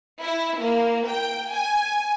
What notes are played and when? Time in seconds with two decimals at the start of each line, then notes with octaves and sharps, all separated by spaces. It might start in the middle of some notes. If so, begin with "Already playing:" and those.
0.21 E4
0.61 A#3
1.08 G5
1.53 G#5